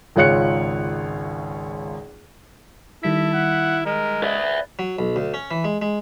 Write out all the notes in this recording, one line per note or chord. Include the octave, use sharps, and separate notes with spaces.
G#1 C#2 F4 C#5 F#6 C#7
D#3 G3 E4 A4 B6
F#5
G#3 A#4
B4 D5 E5
F#3
B1
D2
C#4
E3
G#3
G#3